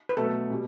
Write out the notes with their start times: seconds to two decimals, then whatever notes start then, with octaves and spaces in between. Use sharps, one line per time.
0.09 B4
0.17 B2 F#3 A3 A4
0.50 B2 G3